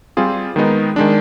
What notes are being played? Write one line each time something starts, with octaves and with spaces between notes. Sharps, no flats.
G3 C4 F4 G#4
D#3 G#3 B3 D#4
D#3 G#3 D4